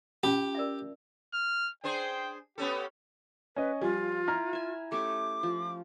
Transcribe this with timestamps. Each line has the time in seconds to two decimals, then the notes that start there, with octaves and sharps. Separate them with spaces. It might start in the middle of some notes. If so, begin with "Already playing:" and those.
0.23 C#4 F4 G4 A5
0.55 A#4 D5 E5
1.34 F6
1.84 D4 G#4 C5 G5
2.58 B3 C#4 G4 A4
3.56 C#4 B4 D#5
3.81 F3 G3 F4 G#5
4.28 E4 A#5 F6
4.53 E5 G#5
4.92 A3 C#4 G4 D6
5.43 F3